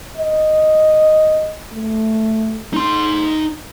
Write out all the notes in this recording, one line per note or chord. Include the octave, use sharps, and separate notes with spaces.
D#5
A3
D#4 C6